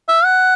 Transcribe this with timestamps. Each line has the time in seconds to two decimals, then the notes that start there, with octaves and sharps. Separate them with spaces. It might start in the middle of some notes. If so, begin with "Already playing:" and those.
0.08 E5
0.25 F#5